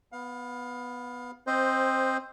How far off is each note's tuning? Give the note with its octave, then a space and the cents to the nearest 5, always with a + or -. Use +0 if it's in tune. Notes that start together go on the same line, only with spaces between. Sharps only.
B3 +0 F5 +30
C4 +15 C5 +0 D#5 +0